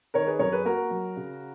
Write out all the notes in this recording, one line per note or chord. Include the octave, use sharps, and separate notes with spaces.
D#3 A#4 C#5
G#4 B4
F#2 A#4 C#5
G#4 B4
A#3 F#4 A#4
F#3
C#3